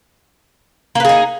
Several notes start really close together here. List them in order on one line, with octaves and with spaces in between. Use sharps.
A#3 B4 G#4 D#4